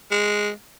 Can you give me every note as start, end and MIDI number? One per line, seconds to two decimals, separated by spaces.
0.11 0.51 56